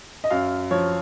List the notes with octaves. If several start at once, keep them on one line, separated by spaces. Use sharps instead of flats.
D#5
F#2 F5
F3 C#5